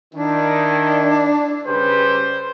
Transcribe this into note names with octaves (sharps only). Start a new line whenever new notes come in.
D#3 D4 E4
C#3 G3 B4 C5